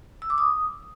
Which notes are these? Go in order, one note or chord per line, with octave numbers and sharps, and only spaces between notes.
E6
D6
D#6